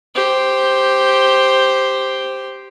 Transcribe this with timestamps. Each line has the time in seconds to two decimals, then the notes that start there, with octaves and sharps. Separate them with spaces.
0.15 G4 C5